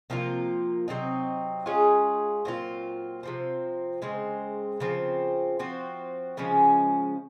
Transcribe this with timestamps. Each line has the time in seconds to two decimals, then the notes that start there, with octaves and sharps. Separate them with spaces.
0.10 C3 F3 A#3 F4
0.88 C3 F#3 C4 D#4
1.66 G#3 C#4 F4 G#4
2.45 A#2 F#3 C4 F4
3.23 C3 F3 C4
4.02 C#3 G#3 C4
4.80 C#3 F3 C4
5.59 F3 C4 F#4
6.37 C#3 F3 G#3 C#4